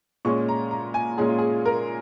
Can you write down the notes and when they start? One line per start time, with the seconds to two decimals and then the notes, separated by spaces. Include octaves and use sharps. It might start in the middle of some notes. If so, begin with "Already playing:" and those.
0.25 A#2 G#3 C#4 C#6
0.49 A#5
0.71 A#5
0.94 G#5
1.18 A#2 G#3 C#4 G#4
1.28 F4
1.39 G#4
1.65 A#4